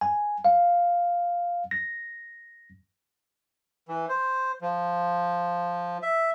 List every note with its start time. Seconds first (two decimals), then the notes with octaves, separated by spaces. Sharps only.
0.01 G#5
0.45 F5
1.71 A#6
3.88 E3
4.09 C5
4.61 F3
6.03 E5